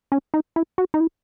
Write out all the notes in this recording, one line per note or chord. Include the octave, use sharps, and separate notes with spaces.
C#4
D#4
E4
F#4
D#4
E4